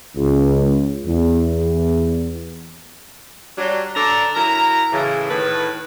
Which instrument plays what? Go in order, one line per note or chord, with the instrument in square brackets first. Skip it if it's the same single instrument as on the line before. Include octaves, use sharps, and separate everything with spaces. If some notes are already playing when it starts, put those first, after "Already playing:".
[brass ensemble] C#2
E2
[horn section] F#3 G3 D4
D3 D4 A4 D5 A#5
F#3 E4 A#4 A#5
A2 C#3 E3
A2 D#3 B4